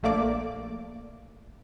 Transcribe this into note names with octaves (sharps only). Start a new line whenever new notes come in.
A#1 A3 A#3 D5 D6